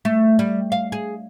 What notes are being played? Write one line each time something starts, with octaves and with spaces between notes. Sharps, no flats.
A3
G3
F5
G#4